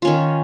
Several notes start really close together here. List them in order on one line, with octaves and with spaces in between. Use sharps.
F4 C#4 D#3